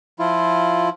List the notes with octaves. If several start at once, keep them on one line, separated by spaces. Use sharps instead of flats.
F3 E4 F4